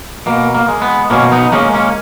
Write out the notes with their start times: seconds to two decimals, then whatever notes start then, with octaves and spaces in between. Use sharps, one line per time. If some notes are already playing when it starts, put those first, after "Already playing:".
0.26 B2 A#3
0.55 A#3
0.68 G#3
0.82 B3
1.10 B2 A#3 C#4
1.32 B3 D#4
1.52 G#3 A#3 C#4
1.74 A#3 C#4